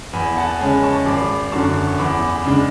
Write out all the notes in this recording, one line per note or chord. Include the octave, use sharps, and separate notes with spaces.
E2 G#5 B5
F#5 A5
C#3 G#3 C#4 G#5 B5
A5 C#6
G#1 B5 D6
F#2 D3 A5 C#6
C#6
E2 B5 D6
B5 D6
C#3 G#3 D4